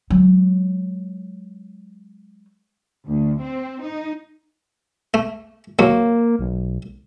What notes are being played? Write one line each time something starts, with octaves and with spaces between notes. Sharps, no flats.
F#3 G#3
D2
C4
D#4
A3
D#2 F#3 A#3
B1